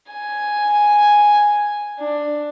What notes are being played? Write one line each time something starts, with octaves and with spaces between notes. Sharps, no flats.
G#5
D4